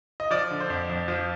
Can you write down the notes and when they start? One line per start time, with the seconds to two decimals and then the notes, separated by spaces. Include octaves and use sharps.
0.20 D#5
0.31 F3 D5
0.51 D3
0.60 C5
0.70 F2
0.89 F2
1.08 F3